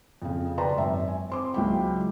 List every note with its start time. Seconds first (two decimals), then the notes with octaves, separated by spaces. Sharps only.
0.22 F2 C#3
0.58 B4 D5 G5 A5 A#5 C6
0.75 G#1 F#2 E5
1.08 G#5
1.30 C4 C6 D6
1.53 C#2 F#3 G#3 E4 G5 B5